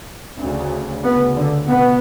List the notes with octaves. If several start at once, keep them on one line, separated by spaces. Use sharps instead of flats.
D2 C#3
D2 C#3 B3
D3
B2 B3